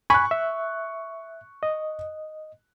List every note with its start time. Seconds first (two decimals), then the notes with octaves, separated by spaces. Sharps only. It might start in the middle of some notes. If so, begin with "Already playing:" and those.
0.10 G#5 B5 C#6 F#6
0.31 E5
1.63 D#5